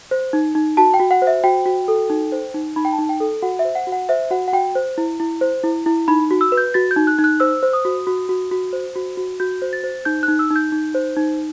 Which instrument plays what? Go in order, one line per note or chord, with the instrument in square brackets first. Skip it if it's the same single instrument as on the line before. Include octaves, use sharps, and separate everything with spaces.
[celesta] C5
D#4
D#4
F#4 A5
G5
F#4
F#5
C5
E5
F#4 G5
F#4
A4
D#4
C5
D#4
D#4 B5
G5
A5
D#4
G5
A4
F#4 F#5
E5
C5
F#5
F#4
F#5
C5 E5
F#4 F#5
F#5
F#4 G5
C5
E4
E4
C5
E4
E4
D#4 B5
F#4
E6
B4
G6
F#4 A6
G6
D#4
F#6
D#4
F#6
C5 E6
C5
D#6
F#4
F#4
F#4
F#4
C5
F#4
F#4
F#4 G6
C5
A6
C5
D#4 G6
F#6
D#4
E6
D#4
G6
D#4
C5
D#4